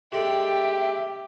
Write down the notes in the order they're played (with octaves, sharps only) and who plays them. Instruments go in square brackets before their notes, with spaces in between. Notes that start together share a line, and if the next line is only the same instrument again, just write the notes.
[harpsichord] G#3 D4 A4 [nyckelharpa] G4 [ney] E5 [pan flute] G5